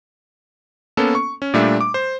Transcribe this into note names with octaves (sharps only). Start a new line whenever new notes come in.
A#3 B3 C#4 A4
C#6
C#4
A#2 G3 A3 D4 E5
D6
C5